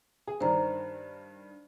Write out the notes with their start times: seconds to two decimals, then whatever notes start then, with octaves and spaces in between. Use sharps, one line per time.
0.27 G#4
0.41 G2 D#3 C5 D5 A#5